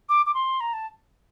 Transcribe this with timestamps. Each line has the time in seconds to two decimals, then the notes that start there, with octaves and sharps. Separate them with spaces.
0.09 D6
0.26 D6
0.34 C6
0.60 A#5
0.73 A5